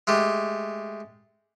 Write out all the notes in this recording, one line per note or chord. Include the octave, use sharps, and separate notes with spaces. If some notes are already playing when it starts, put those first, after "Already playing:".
G#3 A3 G4